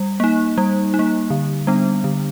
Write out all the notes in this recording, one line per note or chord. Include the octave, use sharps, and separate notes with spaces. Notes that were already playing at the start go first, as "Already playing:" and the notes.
Already playing: G3
A#3 D#4
G3
D#4
A#3
D3
G3 B3 D4
D3